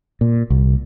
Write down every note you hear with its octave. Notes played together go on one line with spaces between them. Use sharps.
A#2
C2